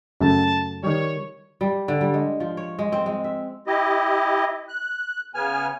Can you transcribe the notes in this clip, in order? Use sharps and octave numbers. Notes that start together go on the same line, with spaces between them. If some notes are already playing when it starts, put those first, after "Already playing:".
F#2 C#3 A3 A5
D#3 G3 C#5
G3
D3
G3
G#3
F3
C#5
G#3
C4
G#3
E5
E4 G4 D#5
F#6
C#3 B3 G#5 F6